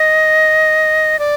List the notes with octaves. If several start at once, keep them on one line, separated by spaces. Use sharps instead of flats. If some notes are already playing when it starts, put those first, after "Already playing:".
Already playing: D#5
D5